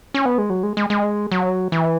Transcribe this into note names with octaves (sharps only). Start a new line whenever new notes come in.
C#4
B3
G#3
F#3
G#3
G#3
G#3
F#3
E3